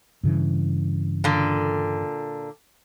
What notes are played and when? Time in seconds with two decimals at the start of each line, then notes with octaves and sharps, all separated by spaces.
0.23 G2 C#3 E3
1.24 A#2 D3